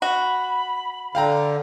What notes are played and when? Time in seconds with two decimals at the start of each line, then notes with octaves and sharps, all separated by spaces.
0.02 F#4 B5
1.15 D3 F5 G5 A#5